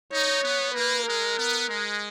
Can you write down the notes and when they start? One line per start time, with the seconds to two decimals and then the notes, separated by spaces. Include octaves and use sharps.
0.12 D#4 C#5
0.43 B3
0.74 A#3 B4
1.06 G#3 A#4
1.37 B3
1.69 G#3